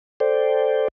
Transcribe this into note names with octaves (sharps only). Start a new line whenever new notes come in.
A4 C5 D5 G5